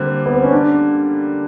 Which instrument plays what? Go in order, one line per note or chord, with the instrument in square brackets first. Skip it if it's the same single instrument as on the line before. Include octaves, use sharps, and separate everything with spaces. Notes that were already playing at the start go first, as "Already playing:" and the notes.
Already playing: [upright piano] D3 G3 A#3 [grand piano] C4
[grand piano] B3
C4
C#4
D4